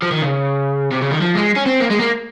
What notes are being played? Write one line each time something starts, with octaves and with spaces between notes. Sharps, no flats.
F3
D#3
C#3
C3
C#3
D#3
F3
G#3
C#4
C4
A#3
G#3
A#3